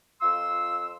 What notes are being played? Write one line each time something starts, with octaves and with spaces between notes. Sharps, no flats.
F2 F4 C6 E6